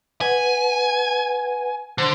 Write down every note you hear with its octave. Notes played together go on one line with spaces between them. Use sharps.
B4 F#5 G#5
D3 C5 C6